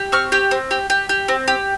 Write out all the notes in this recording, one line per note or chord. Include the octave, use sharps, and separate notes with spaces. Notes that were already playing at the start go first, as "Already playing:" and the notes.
Already playing: G4
C4 C#6 F6
G4
C4
G4
G4
G4
C4
G4